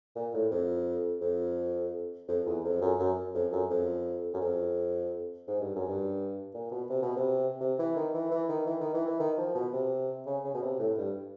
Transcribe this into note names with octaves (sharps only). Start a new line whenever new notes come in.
A#2
A2
F2
F2
F2
E2
F2
F#2
F#2
F2
F#2
F2
F#2
F2
G#2
G2
F#2
G2
A#2
B2
C3
B2
C3
C3
E3
D#3
E3
E3
D#3
E3
D#3
E3
E3
D#3
F3
B2
C3
C#3
C#3
B2
C3
A2
G2